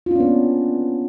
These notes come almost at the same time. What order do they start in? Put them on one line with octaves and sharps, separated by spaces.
F4 D4 C#4 B3 A#3